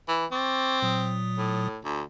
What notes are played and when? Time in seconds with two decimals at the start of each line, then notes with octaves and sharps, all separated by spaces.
0.09 E3
0.32 C4 C#6 D6 A6
0.82 A#2 F#3 D#6
1.38 A2
1.85 D2